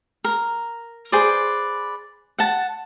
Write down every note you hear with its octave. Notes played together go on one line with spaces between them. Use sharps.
A#4
G#4 B4 C5 D5
F#5 A5